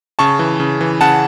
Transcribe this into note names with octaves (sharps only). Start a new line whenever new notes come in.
C#3 A5 C#6
E3
C#3
E3
C#3 F#5 A5